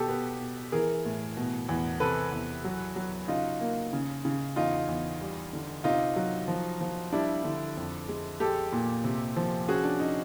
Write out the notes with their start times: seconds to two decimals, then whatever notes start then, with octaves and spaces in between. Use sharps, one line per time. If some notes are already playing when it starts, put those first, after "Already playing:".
Already playing: B2 G4 A4
0.09 B3
0.40 B2
0.72 E3 G#4 A#4
1.05 A2
1.37 B2
1.69 E2
2.00 C3 A4 B4
2.32 E2
2.64 F#3
2.96 F#3
3.28 C#3 D#4 F4
3.61 A#3
3.93 C#3
4.25 C#3
4.56 E2 D#4 F4
4.88 E2
5.21 G3
5.53 D3
5.84 C3 D#4 F4
6.16 F#3
6.48 F3
6.81 F3
7.13 G3 D4 E4
7.44 D3
7.76 F2
8.09 G#3
8.40 G#3 G4 A4
8.72 A#2
9.04 C3
9.37 F3
9.68 C#4 F#4 G#4
9.84 D4
10.00 C#4 D#4